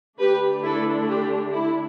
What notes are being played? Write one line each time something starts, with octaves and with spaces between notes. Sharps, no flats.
D3 A3 D4 G4 B4
E4 A4
G4
E4